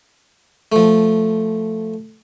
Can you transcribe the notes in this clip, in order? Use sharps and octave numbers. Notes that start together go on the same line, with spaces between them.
F3 A3